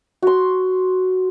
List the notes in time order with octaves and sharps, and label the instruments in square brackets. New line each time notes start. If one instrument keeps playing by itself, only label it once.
[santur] F#4 C6